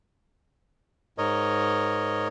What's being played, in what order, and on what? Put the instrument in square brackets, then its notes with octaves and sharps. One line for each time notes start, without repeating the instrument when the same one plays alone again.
[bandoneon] G#2 A#4 C#5 D#5